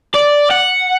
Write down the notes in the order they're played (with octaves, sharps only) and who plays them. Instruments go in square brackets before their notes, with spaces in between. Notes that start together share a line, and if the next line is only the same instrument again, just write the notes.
[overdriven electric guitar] D5
F#5